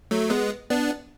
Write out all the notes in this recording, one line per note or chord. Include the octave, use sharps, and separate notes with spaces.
F#3 A3
G#3 B3
B3 D4